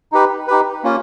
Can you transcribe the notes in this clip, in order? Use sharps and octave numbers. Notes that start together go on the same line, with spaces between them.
D#4 G4 B4
D#4 G4 B4
A#3 C#4 F4